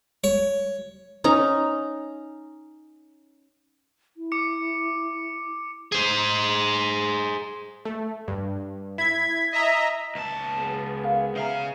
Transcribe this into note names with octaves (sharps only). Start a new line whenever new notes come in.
C#5
C#4 D#4 A#5
E4
D6 C#7
G#4 C5
A3
G2
E4 G#6 B6
D#5 E5 A#5
C#2 A5
F#2 B3 G#4
A#4 F5
C#3 E5 F5 A#5